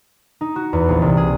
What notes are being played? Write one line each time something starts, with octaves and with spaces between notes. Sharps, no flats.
D#4
F#4
E2
A#1
C2
G#4